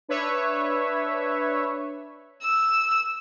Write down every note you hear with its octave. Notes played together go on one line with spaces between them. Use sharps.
D4 B4 C#5 E5
E6